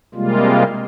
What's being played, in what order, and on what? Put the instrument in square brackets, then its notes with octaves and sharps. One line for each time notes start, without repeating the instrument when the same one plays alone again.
[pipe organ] C3 G3 G#3 A#3 F4